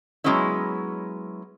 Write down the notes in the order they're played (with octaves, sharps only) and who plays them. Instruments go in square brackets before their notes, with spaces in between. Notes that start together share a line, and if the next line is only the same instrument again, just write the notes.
[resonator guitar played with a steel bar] F#3 G#3 B3 C#4 E4